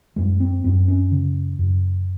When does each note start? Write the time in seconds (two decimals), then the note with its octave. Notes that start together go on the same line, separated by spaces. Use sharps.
0.16 F#2 G#3
0.40 C4
0.64 F#2 C4
0.88 C#4
1.11 C#3
1.59 F#2